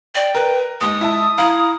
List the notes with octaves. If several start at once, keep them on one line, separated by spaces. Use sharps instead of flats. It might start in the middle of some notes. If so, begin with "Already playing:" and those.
D5 G5
A#4 B4
D#2 G#3 D#6
E4 E5 A5
E4 F5 A#5